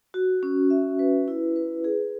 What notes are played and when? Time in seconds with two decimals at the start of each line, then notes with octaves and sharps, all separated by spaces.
0.14 F#4
0.43 C#4
0.70 E5
0.99 B4
1.28 E4
1.56 B4
1.84 G#4